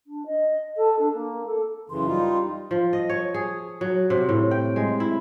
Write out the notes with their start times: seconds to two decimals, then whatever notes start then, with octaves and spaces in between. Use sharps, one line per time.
0.06 D4
0.26 D#5
0.77 A4
0.99 D4
1.14 A#3
1.46 A4
1.90 F#2 C#3 E3 C6
2.06 G3 D#4 F4
2.71 F3
2.93 D#5
3.09 C#5
3.34 G#4
3.81 F#3
4.10 C3
4.29 A2
4.51 G5
4.76 G#3
5.00 E4